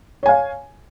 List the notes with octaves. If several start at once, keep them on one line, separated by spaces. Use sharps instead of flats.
C#5 F5 G#5